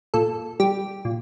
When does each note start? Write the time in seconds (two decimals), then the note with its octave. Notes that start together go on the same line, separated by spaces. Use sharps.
0.14 A#2 A4
0.60 G3 G4
1.05 A#2